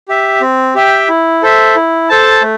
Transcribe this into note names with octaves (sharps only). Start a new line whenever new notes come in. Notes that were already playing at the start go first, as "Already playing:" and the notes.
G4 E5
C4
G4 E5 G5
E4
A4 C5 E5
E4
A4 C5 A5
A3